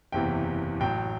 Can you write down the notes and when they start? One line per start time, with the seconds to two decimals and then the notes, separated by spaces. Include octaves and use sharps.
0.12 F#1 E2 C3 E3 G5
0.80 A1 A2 F#3 G5